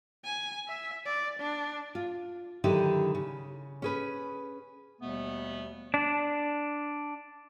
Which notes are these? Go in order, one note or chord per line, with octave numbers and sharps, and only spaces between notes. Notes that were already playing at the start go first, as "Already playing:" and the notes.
G#5
E5
D5
D4
F4
D3 D#3 F#3 D#4 E4 G4
C#3
C#4 G#4 B4
D#2 B2 G3 A3 B3
D4